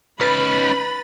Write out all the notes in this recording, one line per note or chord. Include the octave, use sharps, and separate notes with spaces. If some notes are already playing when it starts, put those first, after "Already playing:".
C#4 D#4 B4 B5 A6